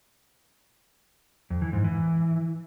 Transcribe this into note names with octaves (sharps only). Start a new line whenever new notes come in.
F2
E3
G#2
E3